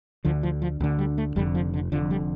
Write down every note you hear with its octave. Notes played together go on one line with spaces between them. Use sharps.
D2 D3 F3
F3
F3
D2 D3
G3
A3
F1 F2 D3 G3
F3
D3
F1 F2 D3 F3
G3